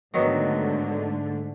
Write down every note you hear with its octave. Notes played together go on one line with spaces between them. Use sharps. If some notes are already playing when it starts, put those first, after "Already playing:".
G#2 D3 D#3 F#3 A3 B3